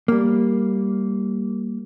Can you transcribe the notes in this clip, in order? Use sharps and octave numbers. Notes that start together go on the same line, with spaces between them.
G3 A#3